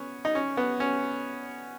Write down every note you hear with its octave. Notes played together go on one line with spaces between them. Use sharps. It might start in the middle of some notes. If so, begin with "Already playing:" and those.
Already playing: B3 C#4
D#4
C#4
B3
C#4